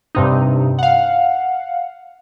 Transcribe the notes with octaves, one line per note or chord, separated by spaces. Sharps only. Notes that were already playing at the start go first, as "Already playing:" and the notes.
G2 C3 D#4
F5 F#5